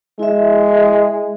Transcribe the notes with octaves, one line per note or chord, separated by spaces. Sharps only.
G#3 E4 E5